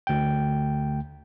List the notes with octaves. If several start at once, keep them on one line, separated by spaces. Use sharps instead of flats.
D2 G5